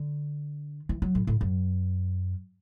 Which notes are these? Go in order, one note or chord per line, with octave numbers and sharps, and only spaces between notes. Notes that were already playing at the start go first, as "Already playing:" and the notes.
Already playing: D3
E3
F#3
A2
A2
F#2